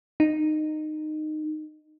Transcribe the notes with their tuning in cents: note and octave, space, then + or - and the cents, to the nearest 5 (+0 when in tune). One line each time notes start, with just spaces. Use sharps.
D#4 -15